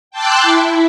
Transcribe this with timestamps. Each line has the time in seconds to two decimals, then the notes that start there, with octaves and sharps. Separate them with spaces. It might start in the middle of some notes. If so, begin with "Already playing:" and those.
0.11 G5 A5 C6 D6 E6 F#6
0.42 E4